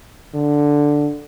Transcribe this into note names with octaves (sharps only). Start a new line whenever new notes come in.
D3